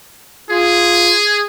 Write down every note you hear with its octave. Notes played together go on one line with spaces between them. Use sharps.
F4 G#4